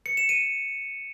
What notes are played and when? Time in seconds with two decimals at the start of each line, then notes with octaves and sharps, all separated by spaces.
0.06 C#7
0.17 E7
0.29 D#7